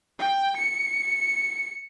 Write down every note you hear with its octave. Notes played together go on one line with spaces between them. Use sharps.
G5
C#7